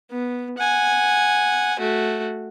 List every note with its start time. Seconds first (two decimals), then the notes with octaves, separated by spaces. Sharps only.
0.11 B3
0.58 F#5 G#5
1.79 A3 F#4